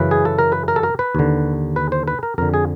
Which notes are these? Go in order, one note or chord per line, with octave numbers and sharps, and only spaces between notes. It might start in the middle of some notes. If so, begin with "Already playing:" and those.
Already playing: F#2 C#3 E3 B4
G#4
A4
A#4
B4
A#4
A4
A#4
B4
D#2 D3
B4
C5
B4
A#4
F2 D3 A#4
G#4